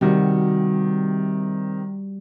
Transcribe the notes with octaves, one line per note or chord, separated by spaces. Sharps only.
C3 D#3 G3 F#4